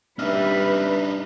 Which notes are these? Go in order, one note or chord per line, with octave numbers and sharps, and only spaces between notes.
G3 D4 D#4 B4 E5 E6 F6